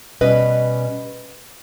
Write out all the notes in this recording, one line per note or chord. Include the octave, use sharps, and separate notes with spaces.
B2 G3 C#4 B4 D#5